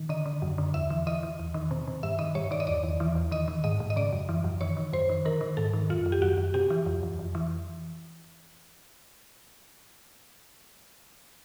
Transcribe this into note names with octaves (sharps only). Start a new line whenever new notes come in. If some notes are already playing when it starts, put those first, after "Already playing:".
Already playing: D#3
D3 D#5
D3
F#2
D3
E2 E5
E3
E3 D#5
E3
E2
D#3
C3
C3
G2 E5
D#3 D#5
G2 C#5
D#3 D5
D#5
E2 D5
E2
E3
E2
D#3 D#5
D#3
G#2 D#5
G#2
D#5
C#3 D5
F#2
E3
F#2
D#3 C#5
D#3
F#2 C5
D#3
D#3 A#4
D#3
G#2 A4
D#3
F#2 F4
F#2
G4
F#2 F#4
F#2
C3 G4
E3
F2
F2
F2
E3